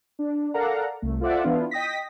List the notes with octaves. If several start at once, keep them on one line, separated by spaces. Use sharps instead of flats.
D4
A4 A#4 D5 F5 F#5 A#5
C2 A3
F4 A4 C5 D5 E5 F#5
E3 B3 D4 E4 F4
D#5 G5 D#6 A#6 B6